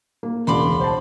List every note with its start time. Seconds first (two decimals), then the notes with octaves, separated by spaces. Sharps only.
0.23 A#3
0.47 E1 C#2 G#3 D5 B5 C6
0.80 C5 A5